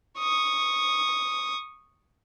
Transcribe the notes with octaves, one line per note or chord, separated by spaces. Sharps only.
C#6 D#6